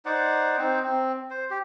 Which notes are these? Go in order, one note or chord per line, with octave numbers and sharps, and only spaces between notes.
D#4 C5 D5 F#5
C4 D#4 C5
C4
C5
G4